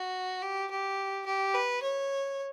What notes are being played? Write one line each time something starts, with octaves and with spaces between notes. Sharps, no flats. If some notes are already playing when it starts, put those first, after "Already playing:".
Already playing: F#4
G4
G4
G4
B4
C#5